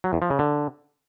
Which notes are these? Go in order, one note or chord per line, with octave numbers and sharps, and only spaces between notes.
F#3
E2
F3
C#3
D3